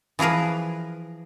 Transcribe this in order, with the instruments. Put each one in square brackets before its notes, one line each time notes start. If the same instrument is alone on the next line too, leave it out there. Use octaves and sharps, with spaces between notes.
[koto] E3 F3 G#4 A#4 B4